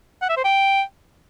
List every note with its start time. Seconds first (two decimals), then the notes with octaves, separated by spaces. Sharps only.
0.22 F#5
0.29 E5
0.37 C5
0.45 G5